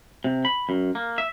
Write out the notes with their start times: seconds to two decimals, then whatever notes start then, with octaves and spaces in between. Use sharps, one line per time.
0.24 C3
0.45 B5
0.69 F#2
0.95 A#3
1.18 E5